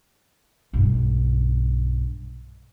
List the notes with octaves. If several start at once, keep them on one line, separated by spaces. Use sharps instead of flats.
B1 G2